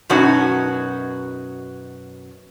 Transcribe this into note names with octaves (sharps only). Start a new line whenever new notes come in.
F#2 B2 C#4 D#4 F#4 C#5